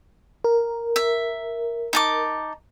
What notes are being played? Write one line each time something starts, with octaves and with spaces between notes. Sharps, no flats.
A#4
E5
D#4 A5 D6